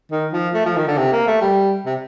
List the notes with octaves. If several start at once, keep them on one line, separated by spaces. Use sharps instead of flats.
D#3
F3
A3
F3
D#3
D3
C3
A#3
A3
G3
C3